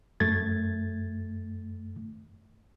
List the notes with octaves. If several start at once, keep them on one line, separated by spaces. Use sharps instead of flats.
F#2 A3 G#6 A6